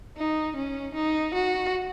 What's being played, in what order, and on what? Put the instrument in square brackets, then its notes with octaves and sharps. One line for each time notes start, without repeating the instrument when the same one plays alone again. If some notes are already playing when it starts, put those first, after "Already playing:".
[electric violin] D#4
C#4
D#4
F#4